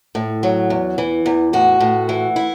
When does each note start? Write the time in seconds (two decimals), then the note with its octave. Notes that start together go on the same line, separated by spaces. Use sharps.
0.15 A2
0.43 F#3
0.70 E2
0.98 E3
1.26 E2
1.53 A2 F#4
1.80 A2
2.09 E3
2.36 E4